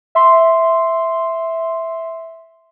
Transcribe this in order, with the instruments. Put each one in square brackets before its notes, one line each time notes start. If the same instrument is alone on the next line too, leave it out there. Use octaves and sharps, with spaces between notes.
[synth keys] E5 C6